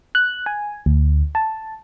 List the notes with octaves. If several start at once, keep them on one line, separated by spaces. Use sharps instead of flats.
F#6
G#5
D2
A5